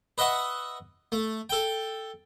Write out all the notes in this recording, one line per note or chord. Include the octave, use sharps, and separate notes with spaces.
B4 D#5 E5 F#5 C#6
A3
A4 G5